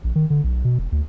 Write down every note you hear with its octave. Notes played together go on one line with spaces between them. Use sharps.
A#1
D#3
D3
B1
B2
E1
D2